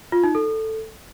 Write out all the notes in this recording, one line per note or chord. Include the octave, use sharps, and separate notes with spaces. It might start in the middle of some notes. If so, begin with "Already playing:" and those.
F4
D#4
A4